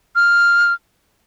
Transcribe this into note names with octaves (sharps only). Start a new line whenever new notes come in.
F6